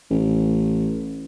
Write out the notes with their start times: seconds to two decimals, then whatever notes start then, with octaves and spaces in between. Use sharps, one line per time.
0.10 A1